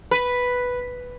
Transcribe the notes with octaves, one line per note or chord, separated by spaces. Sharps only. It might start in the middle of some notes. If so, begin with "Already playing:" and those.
B4